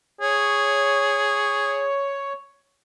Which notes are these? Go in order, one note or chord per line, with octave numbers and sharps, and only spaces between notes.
G#4 C#5